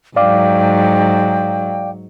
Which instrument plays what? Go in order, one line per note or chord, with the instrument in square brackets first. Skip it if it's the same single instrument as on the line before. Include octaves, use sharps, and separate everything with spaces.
[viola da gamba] G#2 F#3 [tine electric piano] D5 F5 D6 [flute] G5